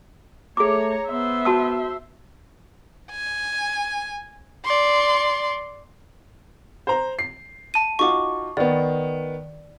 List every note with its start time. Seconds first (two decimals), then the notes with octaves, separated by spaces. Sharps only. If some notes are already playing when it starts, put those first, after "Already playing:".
0.57 A3 G#4 C#5 A#5 D6
1.07 B3 C5 E5
1.45 F#4 A5 E6
3.11 G#5
4.65 D5 C6
6.87 C5 A#5
7.19 C7
7.74 A5 D#7
7.99 D#4 F4 F#4 C#6 D6
8.57 D#3 B3 D5